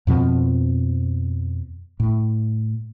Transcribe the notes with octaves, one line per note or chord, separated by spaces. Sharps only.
F2 B2 F3 C4
A2